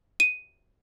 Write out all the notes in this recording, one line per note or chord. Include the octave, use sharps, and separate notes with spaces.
D#7